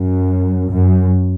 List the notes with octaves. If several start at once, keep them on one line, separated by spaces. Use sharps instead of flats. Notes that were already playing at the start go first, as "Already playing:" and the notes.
Already playing: F#2
F#2